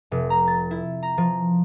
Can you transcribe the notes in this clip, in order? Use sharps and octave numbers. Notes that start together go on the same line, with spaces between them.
F1
A#5
A6
E4
A#5
F3